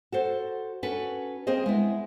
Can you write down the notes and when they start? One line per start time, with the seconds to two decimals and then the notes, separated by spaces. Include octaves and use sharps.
0.12 F#4 A4 C5
0.83 C#4 F#4 A4 B4
1.47 A#3 C4 G#4 C5 D#5
1.66 G#3 B3 E4